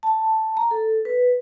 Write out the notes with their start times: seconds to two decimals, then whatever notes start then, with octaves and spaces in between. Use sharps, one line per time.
0.03 A5
0.57 A#5
0.71 A4
1.05 B4